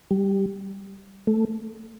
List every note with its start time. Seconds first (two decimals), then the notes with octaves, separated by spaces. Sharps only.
0.11 G3
1.27 A3